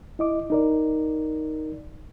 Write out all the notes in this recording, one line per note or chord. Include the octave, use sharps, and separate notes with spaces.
E4 D#5 D6
D#4 A#4 D5